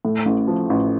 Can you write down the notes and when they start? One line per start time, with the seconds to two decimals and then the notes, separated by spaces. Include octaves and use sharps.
0.05 A2
0.25 A1
0.48 F3
0.70 A1